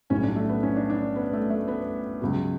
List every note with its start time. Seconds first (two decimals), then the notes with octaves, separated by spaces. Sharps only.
0.10 B1 A2 G3 C#4
0.23 D4
0.36 A3
0.49 B3
0.63 C#4
0.76 D4
0.90 D4
1.16 B3
1.33 A3
1.50 A3
1.68 B3
2.21 C#2 B2 F#3